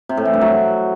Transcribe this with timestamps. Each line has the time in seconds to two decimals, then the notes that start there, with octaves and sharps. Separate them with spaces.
0.09 C3
0.17 A2
0.25 E3
0.33 G2
0.41 F#3